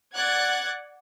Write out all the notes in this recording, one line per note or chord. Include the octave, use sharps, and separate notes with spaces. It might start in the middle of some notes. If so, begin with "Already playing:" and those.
D5 F#5 F#6 G#6 A6